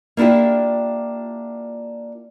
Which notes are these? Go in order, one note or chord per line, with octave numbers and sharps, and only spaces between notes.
A#3 D4 E4 F4 G4